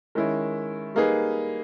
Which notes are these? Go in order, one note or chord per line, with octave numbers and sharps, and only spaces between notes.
D#3 G#3 C#4 E4
G3 A#3 D#4 G#4 B4